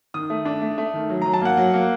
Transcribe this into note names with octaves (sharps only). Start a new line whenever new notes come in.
D#3 D#6
A3
D4
A3
A3
D#3
F#3
F#3 A#5
A5
A#3 F#5
F#3
A#3